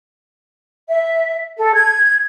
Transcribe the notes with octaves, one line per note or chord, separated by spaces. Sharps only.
E5
A4
G#6